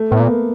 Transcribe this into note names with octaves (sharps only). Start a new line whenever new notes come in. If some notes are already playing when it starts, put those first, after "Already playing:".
Already playing: A3
A2 B3
A#2
A#3